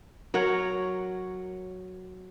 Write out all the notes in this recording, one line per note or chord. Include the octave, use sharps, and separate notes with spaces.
F#3 A#4 C#5 F#5